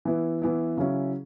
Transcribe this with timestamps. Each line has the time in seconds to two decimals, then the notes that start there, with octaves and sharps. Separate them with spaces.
0.05 E3 B3 E4
0.42 E3 B3 E4
0.77 C#3 F#3 C#4 E4